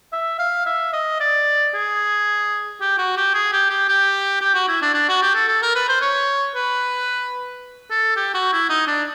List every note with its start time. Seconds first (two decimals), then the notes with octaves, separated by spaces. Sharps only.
0.13 E5
0.39 F5
0.66 E5
0.93 D#5
1.20 D5
1.74 G#4
2.81 G4
2.98 F#4
3.17 G4
3.34 G#4
3.53 G4
3.70 G4
3.88 G4
4.41 G4
4.54 F#4
4.69 E4
4.82 D4
4.94 D4
5.09 F#4
5.22 G4
5.35 A4
5.48 A4
5.62 A#4
5.75 B4
5.89 C5
6.02 C#5
6.55 B4
7.90 A4
8.16 G4
8.34 F#4
8.53 E4
8.70 D#4
8.87 D4